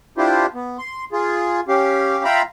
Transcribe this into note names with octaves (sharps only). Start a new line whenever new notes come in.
D4 E4 F4 G4 C5
B3
C6
F4 G#4
C#4 G4 F5
F4 E5 F5 G5 A#5 B5